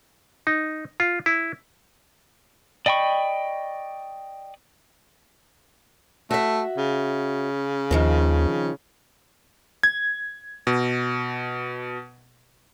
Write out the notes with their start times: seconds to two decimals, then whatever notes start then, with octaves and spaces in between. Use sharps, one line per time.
0.47 D#4
1.00 F4
1.26 E4
2.86 D5 D#5 G5 B5 C#6
6.31 A3 F#4 E5
6.78 C#3
7.91 D#2 D#3 F3 C4
9.83 G#6
10.67 B2